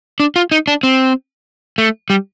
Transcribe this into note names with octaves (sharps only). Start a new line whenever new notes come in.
D4
F4
D#4
D4
C4
A3
G3